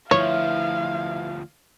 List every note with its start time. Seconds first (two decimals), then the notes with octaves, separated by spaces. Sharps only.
0.11 D2 F3 E4 B4 C#5 F5